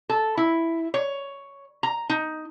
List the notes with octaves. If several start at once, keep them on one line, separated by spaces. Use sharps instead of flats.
A4
E4
C#5
A#5
D#4